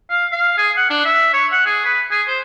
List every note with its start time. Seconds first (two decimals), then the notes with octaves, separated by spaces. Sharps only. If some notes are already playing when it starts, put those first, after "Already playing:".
0.10 F5
0.32 F5
0.58 G#4
0.77 F#5
0.90 D4
1.05 E5
1.33 C#5
1.52 F#5
1.66 G#4
1.85 B4
2.11 G#4
2.28 C5